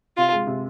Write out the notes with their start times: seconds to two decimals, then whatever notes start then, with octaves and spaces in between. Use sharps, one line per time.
0.17 C3 F4
0.32 G#3
0.47 C3